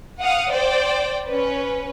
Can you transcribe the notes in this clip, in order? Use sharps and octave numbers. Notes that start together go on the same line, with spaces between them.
F5 F#5 D#6
C5 D5 G5
C#4 B4